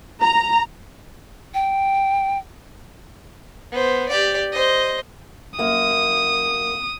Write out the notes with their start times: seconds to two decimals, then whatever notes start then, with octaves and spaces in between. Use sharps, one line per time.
0.22 A#5
1.54 G5
3.72 B3 C5
4.09 G4 D5
4.52 C5 D#5
5.58 F#2 A#3 D#6